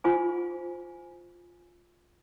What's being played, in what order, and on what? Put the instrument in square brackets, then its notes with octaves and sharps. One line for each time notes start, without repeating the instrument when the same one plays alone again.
[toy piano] F4 C5 G#5